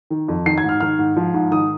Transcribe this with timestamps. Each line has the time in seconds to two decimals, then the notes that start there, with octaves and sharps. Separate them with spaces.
0.10 D#3
0.28 F2
0.46 D#3 C7
0.58 G#6
0.64 G#2
0.69 F6
0.80 D#3 F6
0.99 G#2
1.16 F3
1.34 G#2
1.51 D#3 D#6